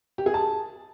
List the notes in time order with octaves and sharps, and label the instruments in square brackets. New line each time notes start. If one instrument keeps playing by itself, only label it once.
[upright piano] G4
G#4
A5